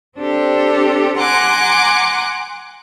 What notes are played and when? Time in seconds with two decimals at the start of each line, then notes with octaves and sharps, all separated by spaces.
0.19 C4 D4 G4 A4
1.19 F#5 G#5 A#5 C6 D6 F#6